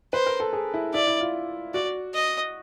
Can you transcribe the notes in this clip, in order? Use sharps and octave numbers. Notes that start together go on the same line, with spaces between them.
B4 C5
A#4
A4
G#4
E4
E4 D5
E4
F4
F#4 D5
D#5